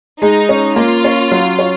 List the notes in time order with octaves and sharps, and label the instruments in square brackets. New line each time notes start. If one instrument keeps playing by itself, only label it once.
[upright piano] G#3 [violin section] D#4
[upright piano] C#4
[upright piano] A#3 [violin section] F4
[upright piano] C#4
F#3
C#4